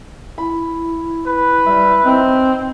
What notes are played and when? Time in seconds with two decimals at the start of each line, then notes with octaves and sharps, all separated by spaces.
0.38 E4 B5
1.26 B4
1.66 G3 E5
2.04 C4 D#4 A#5